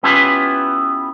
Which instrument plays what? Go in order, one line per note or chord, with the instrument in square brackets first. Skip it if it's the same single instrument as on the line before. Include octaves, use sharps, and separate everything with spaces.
[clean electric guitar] B3 C#4 E4 F4 G4 B4